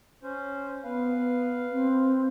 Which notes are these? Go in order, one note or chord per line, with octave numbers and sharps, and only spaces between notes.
C#4 C5
B3 B4 F5
C4